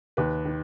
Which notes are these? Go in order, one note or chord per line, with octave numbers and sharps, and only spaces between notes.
D#2 B4
D#3